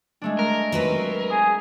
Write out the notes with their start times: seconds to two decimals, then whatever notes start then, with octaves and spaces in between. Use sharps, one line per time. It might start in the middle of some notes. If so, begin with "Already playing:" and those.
0.21 G#3 A3 D4
0.39 A#4
0.72 F#3 C4 B4
1.31 G#4